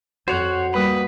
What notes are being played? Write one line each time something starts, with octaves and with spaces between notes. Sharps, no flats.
F2 F#4 C5 C#5 F#5
G3 A#3 B4 B5 D#6